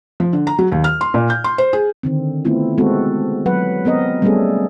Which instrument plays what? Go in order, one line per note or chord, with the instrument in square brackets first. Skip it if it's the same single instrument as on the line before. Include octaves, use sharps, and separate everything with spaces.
[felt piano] F3
D3
A#5
F#3
D#2
F6
C6
A#2
G6
C6
C5
G#4
[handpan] D3 D#3 C4
A3 B3 C4 E4 F4
G#3 B3 C4 F#4 A4
F#3 B4 F#5
B3 C4 A#4 D#5
G3 A3 B3 C#4 G#4 A4